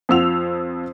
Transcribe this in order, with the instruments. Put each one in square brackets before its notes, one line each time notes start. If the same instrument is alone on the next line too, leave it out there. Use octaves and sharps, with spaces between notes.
[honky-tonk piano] F2 F3 E6 F7